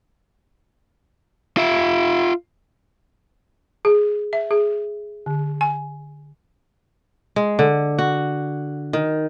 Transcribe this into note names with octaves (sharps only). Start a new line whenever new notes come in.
F4 E5
G#4
E5
G#4
D3
G#5
G#3
D3
F#4
D#3